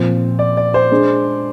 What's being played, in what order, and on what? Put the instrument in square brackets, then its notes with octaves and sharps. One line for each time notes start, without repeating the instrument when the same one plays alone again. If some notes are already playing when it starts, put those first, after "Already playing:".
Already playing: [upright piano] A#2 F3 C4
[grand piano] D5
D5
C5
[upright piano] G#3 D4 G#4